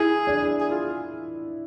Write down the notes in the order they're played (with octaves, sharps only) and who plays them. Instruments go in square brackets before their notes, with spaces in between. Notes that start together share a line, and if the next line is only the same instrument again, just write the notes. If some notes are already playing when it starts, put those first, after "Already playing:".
Already playing: [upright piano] E4 [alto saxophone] G#4
[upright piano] D4
[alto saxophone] G#4
F4